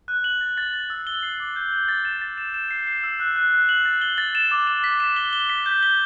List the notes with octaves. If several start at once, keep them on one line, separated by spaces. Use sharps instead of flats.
F#6
F#7
A6
A6
A6
E6
G7
C7
D6
G6
G6
A6
E7
A6
E7
E7
C7
C7
E6
F#6
F#6
F#6
F#7
A6
G7
A6
E7
D6
E7
B6
E7
G7
G7
B6
G6
G7